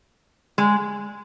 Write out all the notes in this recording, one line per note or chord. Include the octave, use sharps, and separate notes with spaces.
G#3